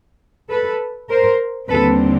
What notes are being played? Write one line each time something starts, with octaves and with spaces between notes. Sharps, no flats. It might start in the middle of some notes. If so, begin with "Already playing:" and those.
A4 B4
A#4 C5
D#2 D3 G3 C4 A4 B4